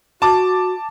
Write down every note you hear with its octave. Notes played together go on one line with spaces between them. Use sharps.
F#4 A5 D6